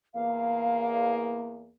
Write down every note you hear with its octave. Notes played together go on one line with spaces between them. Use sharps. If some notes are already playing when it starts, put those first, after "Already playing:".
E2 A#3 F5